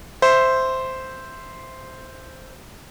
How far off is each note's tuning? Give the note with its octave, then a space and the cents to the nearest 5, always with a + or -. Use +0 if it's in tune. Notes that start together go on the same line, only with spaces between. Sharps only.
C5 -5 E5 +0